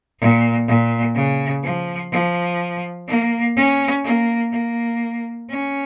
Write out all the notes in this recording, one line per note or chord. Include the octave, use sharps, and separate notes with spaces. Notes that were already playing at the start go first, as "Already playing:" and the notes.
A#2
A#2
C#3
F3
F3
A#3
C#4
A#3
A#3
C#4